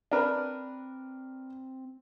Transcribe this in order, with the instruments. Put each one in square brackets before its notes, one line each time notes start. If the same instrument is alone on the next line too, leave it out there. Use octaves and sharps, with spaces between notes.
[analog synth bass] C4 [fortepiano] D4 A#4 B4